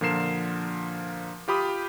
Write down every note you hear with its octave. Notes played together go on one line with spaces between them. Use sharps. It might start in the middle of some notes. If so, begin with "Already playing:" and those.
A#2 D3 F3 A#4 C7 E7
F4 G4 B5 D#6